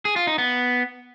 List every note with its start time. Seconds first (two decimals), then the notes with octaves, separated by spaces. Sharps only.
0.05 G#4
0.16 F4
0.27 D#4
0.38 B3